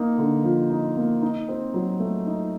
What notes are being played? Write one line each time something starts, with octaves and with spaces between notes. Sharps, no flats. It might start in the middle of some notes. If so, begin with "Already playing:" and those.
Already playing: A#3 D#4
D3
F3
D#4
A#3
D#4
C4
F#3
A3
D#4